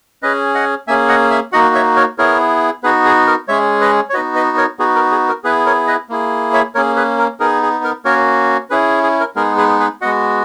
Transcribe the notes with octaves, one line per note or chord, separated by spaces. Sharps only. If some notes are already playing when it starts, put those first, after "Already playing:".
C#4 G#4 B4 D#5
D#5 F#5
A#3 C#4 G#4 E5 G#5
D#5 F#5
E5 G#5
A#3 D#4 F#4 D#5 F#5
C#5 E5
A#4 C#5
B3 E4 G#4 A#4 C#5
B3 D#4 F#4 G#4 B4
G#4
A#4
G#3 C#4 G#4 C#5 E5
B4 D#5
C#5
B3 D#4 F#4 B4 D#5
B4 D#5
A#4 C#5
B3 D#4 F#4 G#4
A#4
G#4
A#4
B3 E4 G#4 B4
A#4 C#5
B4 D#5
A#3 E4 G#4
C#5 E5
A#3 C#4 G#4 A#4 C#5
G#4 B4
A#4
B3 D#4 G#4 A#4
G#4
A#4
A#3 C#4 F#4 A#4 C#5
C#4 E4 G#4 B4
G#4
A#4
G#3 B3 D#4 G#4 A#4
G#4 B4
G#4 B4
G#3 B3 F#4 D#5 F#5